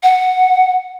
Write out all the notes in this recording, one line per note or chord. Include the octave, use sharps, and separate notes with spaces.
F#5